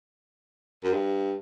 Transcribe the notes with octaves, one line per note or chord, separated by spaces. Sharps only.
F#2
G2